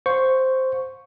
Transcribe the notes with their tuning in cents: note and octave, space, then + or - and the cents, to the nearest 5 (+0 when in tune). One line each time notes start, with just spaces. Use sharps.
C5 +0 F5 +45 C#6 +0